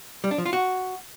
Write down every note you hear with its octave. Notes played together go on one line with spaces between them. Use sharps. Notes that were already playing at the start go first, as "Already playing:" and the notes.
G3
D4
F3
F4
F#4